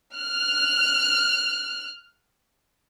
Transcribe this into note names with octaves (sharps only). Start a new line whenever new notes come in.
F6 F#6